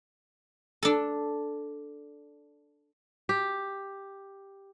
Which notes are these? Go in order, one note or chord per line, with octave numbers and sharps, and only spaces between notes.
D4 A4
G4